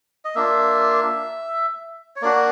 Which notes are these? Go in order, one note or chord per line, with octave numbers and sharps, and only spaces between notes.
D#5
A#3 D4 F4 E5
C#5
A#3 D4 F#4 D5